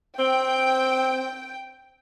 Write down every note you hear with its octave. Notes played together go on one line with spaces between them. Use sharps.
C4 G5